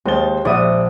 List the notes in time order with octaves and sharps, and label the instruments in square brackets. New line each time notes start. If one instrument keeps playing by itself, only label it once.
[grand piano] D#2 C5 G7 [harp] G#3 A6
[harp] A#1 D#6 D#7 [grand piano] D5 E5 F#5